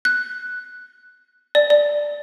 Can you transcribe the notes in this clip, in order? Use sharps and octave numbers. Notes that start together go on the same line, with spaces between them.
F#6
D5
D5